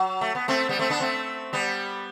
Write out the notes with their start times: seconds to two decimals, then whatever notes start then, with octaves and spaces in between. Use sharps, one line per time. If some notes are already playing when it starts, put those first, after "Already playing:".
Already playing: F#3
0.21 A3
0.35 B3
0.48 A3 C4
0.69 G3 B3
0.79 A3 C4
0.90 B3 D4
1.00 A3 C4
1.53 G3 B3